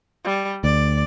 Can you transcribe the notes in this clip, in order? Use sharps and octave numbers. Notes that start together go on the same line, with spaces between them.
G3
D2 D5